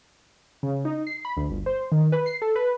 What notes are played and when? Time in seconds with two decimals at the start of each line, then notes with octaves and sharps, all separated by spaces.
0.63 C#3
0.85 D#4
1.07 C7
1.25 B5
1.37 D2
1.50 G1
1.66 C5
1.92 D#3
2.12 B4
2.26 C7
2.42 A4
2.56 B4